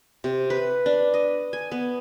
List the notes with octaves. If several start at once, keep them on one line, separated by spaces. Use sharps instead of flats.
C3
B4
D4
D#5
G#5
B3